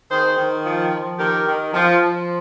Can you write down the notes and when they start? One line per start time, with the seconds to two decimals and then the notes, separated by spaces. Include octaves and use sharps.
0.10 D#3 G#4 C5
0.37 D#3
0.64 F3
0.91 F3
1.18 D#3 G4 A#4
1.46 D#3
1.73 F3
2.00 F3